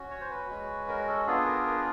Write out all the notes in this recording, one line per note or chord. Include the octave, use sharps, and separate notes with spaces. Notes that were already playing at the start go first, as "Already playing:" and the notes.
Already playing: C#4 F#4
C#5
C5
B4
G#3 C#4 F#4
A#4
A4
B3 D4 F4 G#4 A4
A#4
A#4